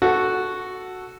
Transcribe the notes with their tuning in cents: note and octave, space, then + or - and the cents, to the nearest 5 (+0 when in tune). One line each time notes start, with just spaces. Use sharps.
F#4 +0 A4 +0